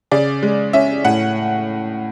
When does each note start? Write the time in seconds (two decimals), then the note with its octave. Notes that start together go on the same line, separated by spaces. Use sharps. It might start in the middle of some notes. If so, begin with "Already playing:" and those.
0.12 C#3 D5
0.43 G#3
0.73 C#4 E5
1.05 A2 F#5